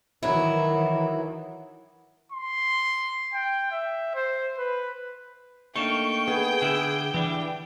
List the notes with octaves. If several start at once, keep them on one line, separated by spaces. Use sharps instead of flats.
D#3 E3 F#3 E4
C6
G5
E5
C5
B4
A3 A#3 D4 D#4 F5 G5 C#6
B3 G#4
D3 E4
E3 D4 G4